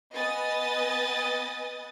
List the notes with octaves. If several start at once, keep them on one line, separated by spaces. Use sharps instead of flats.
B3 B4 D#5 G#5 D#6 A6